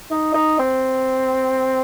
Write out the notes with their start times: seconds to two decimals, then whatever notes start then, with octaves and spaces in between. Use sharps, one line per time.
0.11 D#4
0.34 D#4
0.59 C4